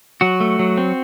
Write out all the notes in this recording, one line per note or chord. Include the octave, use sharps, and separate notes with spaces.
F#3 F#4
A3
F#3
C4